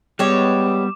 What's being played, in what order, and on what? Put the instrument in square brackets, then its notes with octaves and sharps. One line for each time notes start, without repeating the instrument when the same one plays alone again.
[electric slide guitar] G3 [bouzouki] G#3 G4 C#5 [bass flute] B3 [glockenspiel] D6 E7